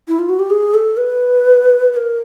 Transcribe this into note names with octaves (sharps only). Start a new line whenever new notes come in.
E4
F4
F#4
G4
G#4
A4
B4
B4
A#4